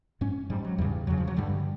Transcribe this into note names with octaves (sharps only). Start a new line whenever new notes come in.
G#2 C#4
G#2 G3
F#3
E2 C#3 G3
E2 C#3 F#3
F3
F#3
G2 D3 G3